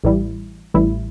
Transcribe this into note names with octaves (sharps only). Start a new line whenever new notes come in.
A1 A2 E3 G3 E4
A1 A2 E3 G3 E4